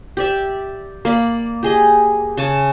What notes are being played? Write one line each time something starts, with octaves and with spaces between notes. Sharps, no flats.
G4 D5 E5
A#3 D5 B5
G4 G#4 D#5
C#3 G#5 A5 C#6